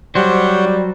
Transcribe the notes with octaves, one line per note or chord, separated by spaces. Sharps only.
F#3 G3 G4 C5 C#5 F#5